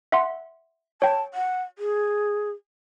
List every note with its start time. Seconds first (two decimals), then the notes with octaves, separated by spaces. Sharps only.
0.12 E5 F#5 C6
1.02 C#5 G5 A5
1.34 F#5
1.79 G#4